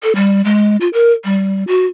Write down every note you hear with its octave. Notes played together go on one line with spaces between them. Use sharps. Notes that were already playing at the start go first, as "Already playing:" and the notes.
A4
G3
G#3
F4
A#4
G3
F#4